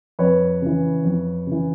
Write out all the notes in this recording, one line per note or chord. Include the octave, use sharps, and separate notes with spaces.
F2 B4 C#5
C#3 E3
F2
C#3 E3